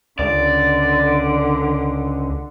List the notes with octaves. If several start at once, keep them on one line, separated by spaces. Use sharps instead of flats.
C#2 D3 D5